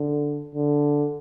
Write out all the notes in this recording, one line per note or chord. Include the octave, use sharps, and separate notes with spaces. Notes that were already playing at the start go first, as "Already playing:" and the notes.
Already playing: D3
D3